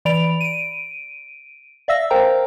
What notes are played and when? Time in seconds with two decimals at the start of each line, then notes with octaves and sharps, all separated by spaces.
0.05 E3 D5 B5 D7 F7
0.41 D7 D#7
1.88 D5 E5 F5 E6 A#6
2.10 A#4 C5 F5 G5 A#5